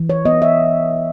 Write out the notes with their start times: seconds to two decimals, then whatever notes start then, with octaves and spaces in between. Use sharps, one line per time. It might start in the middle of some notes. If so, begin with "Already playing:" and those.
Already playing: E3
0.10 C#5
0.25 B3 D#5
0.42 E5